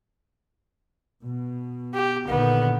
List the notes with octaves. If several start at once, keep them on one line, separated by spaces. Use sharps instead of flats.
B2
G4
A#1 D3 D#3 B3